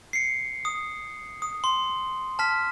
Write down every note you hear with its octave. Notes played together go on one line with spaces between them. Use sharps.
C7 C#7
D#6
D#6
C6
A5 F6 B6